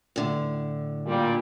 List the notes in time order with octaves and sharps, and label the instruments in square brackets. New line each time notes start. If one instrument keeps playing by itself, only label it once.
[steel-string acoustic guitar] A2 D3
[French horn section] A#2 G3